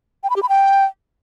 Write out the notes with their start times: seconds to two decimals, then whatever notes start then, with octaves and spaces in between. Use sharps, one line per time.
0.24 G5
0.30 B5
0.36 G4
0.43 B5
0.49 G5